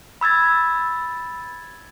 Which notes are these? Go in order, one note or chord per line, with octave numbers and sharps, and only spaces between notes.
B5 E6 G#6 A6